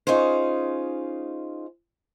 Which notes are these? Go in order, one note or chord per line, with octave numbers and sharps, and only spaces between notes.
C#4 D#4 F4 G#4 C5